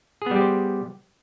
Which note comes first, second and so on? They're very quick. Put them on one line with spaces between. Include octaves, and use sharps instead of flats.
G#4 B3 G3 G4 C5